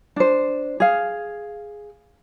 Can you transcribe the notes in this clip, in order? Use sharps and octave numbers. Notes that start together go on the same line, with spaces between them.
D4 C5
G#4 F5